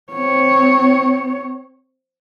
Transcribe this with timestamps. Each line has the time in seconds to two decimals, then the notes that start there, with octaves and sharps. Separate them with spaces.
0.12 C4 C#5